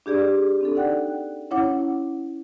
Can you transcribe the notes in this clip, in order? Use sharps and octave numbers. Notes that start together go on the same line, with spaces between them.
D4 G4 G#4 D5
C4 D4 A4
D#4 D5 F#5 G5 F#6
C#4 E4 C#5 F#5 D6